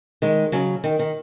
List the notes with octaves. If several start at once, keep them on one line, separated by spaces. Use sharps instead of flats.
D#3 G#3
C#3 F#3
D#3
D#3